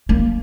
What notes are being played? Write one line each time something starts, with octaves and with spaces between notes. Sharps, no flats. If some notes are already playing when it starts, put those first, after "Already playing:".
A#3